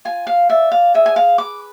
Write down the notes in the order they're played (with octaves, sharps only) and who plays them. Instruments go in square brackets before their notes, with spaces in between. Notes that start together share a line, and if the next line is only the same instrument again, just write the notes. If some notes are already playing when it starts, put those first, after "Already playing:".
[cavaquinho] F4 G#5
F5
D5 E5
F5
G#4 E5
G#5
F5
B4 D6